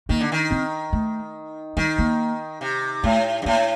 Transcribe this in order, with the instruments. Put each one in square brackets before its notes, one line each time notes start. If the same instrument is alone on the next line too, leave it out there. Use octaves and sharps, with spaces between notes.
[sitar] D#3 [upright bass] A#3
[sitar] D3
D#3
[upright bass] C4
A3
[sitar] D#3 [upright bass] G3
[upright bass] A#3
[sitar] C3
[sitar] A2 [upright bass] A3
[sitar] G2
[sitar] A2 [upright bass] A#3